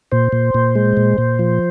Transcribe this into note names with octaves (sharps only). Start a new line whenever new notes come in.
A#2 C5
A#2
A#2
G#3
A#2
A#2
F3